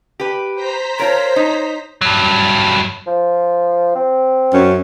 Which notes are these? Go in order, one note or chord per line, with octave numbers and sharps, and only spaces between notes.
G4 B4
C5 A#5 B6
F4 A#4 C#5
D#4
G2 F#3
F3
C4
F#2 C#4